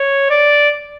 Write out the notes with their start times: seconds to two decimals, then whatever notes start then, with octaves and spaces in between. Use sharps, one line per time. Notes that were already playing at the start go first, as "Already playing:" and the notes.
Already playing: C#5
0.30 D5